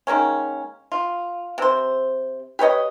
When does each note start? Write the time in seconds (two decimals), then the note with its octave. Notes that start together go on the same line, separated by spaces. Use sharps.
0.07 D#3 G#3 A#3 C#4
0.92 F4
1.58 C3 C5
2.59 G4 B4 C#5 D#5